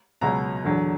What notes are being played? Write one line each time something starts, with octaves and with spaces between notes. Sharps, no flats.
C#2 B2 F#3 A#5
E2 D3 F#3